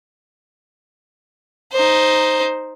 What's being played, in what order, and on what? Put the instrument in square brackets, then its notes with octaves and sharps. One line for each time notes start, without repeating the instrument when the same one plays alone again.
[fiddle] D#4 C5